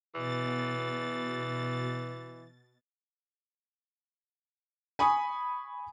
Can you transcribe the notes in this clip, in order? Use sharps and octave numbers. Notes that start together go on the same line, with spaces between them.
B2 E3 A6
G#5 B5 C#6 D#6